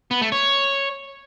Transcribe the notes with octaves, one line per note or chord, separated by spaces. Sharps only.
B3
A3
C#5